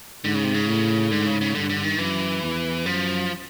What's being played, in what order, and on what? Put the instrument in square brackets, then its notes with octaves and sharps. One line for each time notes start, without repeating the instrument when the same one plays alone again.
[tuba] G#2 [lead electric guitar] D3
[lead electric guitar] C#3
C3
C#3
[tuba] A2
[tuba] G#2 [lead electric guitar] D3
[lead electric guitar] C#3
C#3
[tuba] G2 [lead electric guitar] D3
[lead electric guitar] D3
D#3
[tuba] F#2 [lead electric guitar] E3
[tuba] E2
[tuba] F#2 [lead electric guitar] F3